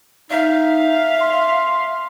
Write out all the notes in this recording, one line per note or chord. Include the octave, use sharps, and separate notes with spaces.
D#4 E5 F5
C6